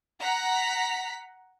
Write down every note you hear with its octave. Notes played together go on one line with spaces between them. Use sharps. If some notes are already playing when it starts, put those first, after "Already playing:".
F#5 A#5 B6